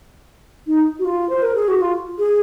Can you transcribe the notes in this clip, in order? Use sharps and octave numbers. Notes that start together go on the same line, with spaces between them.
D#4
F#4
F4
C5
A#4
G#4
F#4
F4
G#4